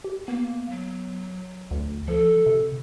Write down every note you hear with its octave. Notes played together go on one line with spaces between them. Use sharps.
G4
A#3 B3
F#3
D2
F3 A4
C3